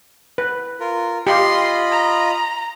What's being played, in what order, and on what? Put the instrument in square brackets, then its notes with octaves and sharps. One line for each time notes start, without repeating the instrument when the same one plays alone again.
[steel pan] B4
[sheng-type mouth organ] F4 A#4
[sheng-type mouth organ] F4 D#5 B5 [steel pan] G4 F5 [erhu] C6
[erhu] A#5